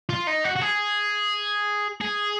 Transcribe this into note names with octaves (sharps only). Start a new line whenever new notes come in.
F4
D#4
F#4
F#4
G#4
G#4